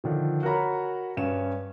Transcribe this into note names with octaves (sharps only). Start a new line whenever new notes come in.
D3 D#3 F3
F#4 A#4 C#5 A#5 B5
G2 C#4 E7